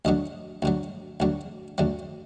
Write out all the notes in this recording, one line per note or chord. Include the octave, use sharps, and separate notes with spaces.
D2 D3 F#3 D#5
D2 D3 F#3
D2 D3 F#3
D2 D3 F#3